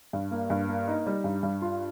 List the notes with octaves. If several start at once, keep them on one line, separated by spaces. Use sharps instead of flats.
G2
A#3
G2
A#3
D#4
G3
G2
G2
F4